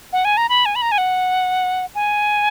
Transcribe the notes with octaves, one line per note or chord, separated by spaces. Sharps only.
F#5
G#5
A#5
B5
G#5
B5
A#5
G#5
F#5
G#5